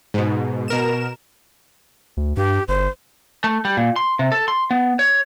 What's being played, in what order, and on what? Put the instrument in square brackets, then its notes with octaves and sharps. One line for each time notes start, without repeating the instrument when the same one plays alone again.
[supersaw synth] G#2 B2
B2 A#4 E7
[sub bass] D2
[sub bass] G2 [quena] G4
[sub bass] G1 [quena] C5
[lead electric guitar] A3
G3
A#2
C6
C3
A4
C6
B3
C#5